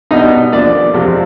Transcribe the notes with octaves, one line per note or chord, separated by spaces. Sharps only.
B2 G3 B3 D4 D#4 D#5
D#2 D3 F3 D4 D5
F2 C3 F3 G#3